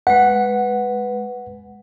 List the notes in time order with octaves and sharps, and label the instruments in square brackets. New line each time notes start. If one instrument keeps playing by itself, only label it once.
[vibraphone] G#3 B4 [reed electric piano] F#5